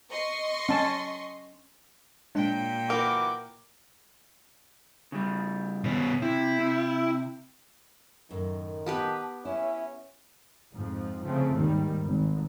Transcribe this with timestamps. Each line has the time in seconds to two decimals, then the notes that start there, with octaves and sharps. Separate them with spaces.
0.10 D#5 C6 C#6
0.69 C#4 A5
2.35 A#2 G#3 D4 C#5 G5
2.90 E3 F#4 A#4 D6
5.12 C#3 G3
5.84 B2 C#4
6.22 C3 E4
6.59 C3
8.31 F#2 A2 D#3
8.86 B3 G4 B4 A5
9.45 C#4 E4 E5
10.74 F2 G#2 F3
11.24 C#3 F3 A3 C4
11.55 D#2 G#2 D#3 G3
12.05 G#1